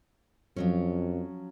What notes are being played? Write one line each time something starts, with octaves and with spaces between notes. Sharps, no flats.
F2 F3 F#3 C#4